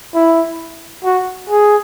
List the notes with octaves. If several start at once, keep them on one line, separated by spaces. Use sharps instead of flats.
E4
F#4
G#4